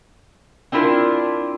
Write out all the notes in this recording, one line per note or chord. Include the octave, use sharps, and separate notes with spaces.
C4 D4 E4 F4 A#4